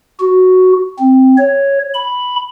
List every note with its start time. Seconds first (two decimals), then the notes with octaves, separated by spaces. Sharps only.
0.20 F#4
0.99 C4
1.38 C#5
1.94 B5